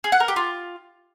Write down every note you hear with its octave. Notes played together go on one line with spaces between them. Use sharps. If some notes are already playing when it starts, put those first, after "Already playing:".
G#4
F#5
A#4
G4
F4